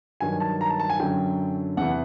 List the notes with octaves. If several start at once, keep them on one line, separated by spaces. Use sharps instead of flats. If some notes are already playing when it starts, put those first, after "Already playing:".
G2 D#3 F#3 G#5
A5
A#5
A5
A5
G#5
F#2 D3 F#3 G5
E2 C3 E3 F#5